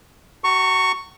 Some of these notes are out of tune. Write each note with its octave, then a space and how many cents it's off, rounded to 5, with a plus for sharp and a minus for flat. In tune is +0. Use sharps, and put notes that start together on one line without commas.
F#4 +35 A#5 -35 C#6 +0